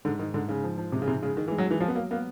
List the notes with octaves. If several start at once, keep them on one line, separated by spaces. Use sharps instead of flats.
G#2 D3
G#2 D#3
G#2 D3
G#2 C#3
F3
F3
C3 G#3
C#3
G#2 C3
C#3 G#3
G#2 D#3
E3
G#3
F#3
E3 G#3
F3 F#3
B3
F#3 A#3
A#3 B3